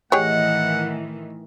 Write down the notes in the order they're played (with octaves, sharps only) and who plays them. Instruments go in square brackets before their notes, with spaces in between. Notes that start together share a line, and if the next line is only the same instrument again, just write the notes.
[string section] A2 D#3 E3 [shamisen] G4 G#4 C#5 [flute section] D#5 [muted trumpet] F#5